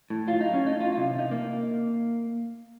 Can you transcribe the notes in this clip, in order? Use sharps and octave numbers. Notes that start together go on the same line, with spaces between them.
A2
F#3 F4
F#3 D#4
C#4
A2 D#4
F#3 F4
C3 F4
C3 D#4
C3 A#3